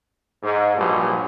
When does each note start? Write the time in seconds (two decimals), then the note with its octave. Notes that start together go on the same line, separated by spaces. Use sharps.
0.43 G#2
0.76 A#1 G2 F#3